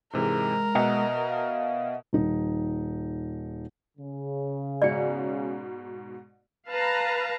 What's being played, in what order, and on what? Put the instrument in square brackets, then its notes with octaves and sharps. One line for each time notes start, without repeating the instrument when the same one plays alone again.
[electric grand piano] G#2 C3 E3 [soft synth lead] G#3 [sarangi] A#4
[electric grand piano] B2 [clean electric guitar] D#5 E5 F#5
[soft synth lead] F5
[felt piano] D#1 D#4
[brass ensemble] C#3
[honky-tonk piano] G#2 B2 C#7 [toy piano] D5
[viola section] B4 F5 A5 A#5